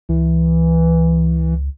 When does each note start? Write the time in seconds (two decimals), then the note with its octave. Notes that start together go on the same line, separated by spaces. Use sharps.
0.09 C#2 E3